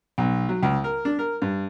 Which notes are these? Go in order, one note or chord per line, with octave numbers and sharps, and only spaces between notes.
B1
F#3
C#2
A#4
D4
A#4
G2